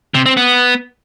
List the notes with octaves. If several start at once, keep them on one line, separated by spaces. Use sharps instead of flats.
C3
C4
B3